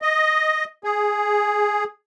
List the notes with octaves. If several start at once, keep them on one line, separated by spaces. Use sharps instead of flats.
D#5
G#4